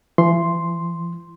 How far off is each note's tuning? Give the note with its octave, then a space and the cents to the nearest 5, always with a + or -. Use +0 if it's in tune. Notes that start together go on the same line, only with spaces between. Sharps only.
E3 +40 C6 +0